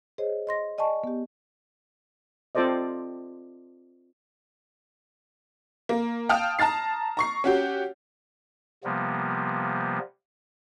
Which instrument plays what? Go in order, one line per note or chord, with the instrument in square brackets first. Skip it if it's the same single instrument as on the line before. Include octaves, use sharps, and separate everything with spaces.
[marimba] G#4 C5 C#5 D#5
D#5 C6 A#6
D5 D#5 G#5 A5 C#6
B3 G4
[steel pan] C4 F4 A4 C5 D5 D#5
[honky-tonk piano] A#3
F5 G5 A5 D#6 F6
A5 A#5 F6 A6 C7
A#5 C#6 C7
C#4 F#4 G4
[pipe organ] C3 F3 G3 A#3 B3